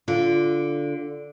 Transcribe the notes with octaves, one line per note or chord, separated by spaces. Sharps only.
D3 F4